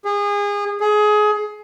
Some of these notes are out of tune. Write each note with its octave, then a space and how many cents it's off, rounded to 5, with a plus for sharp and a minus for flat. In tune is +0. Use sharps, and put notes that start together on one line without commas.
G#4 -30
G#4 +20